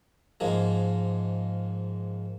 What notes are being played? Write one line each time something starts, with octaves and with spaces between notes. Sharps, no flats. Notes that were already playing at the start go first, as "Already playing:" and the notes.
G#2 F3 G#3 A#3